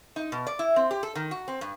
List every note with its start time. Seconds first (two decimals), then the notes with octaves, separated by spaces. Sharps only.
0.16 D#4
0.32 B2
0.47 D5
0.59 E4
0.76 C4
0.91 G4
1.03 A4
1.15 D#3
1.31 F#4
1.48 C4
1.61 G2